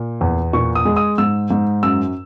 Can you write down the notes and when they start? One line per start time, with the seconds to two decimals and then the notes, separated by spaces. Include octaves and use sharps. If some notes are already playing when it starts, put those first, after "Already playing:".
Already playing: A#2
0.21 E2
0.53 A#2 C#6
0.75 D#6
0.85 G#3
0.96 D#6
1.18 G#2 E6
1.51 G#2
1.83 F#2 E6